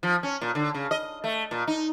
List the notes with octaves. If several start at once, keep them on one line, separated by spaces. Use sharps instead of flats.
F3
C#4
A#2
D3
C#3
D#5
A3
A#2
D#4